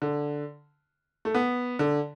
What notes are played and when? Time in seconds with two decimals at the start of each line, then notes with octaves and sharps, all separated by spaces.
0.02 D3
1.25 A3
1.34 B3
1.79 D3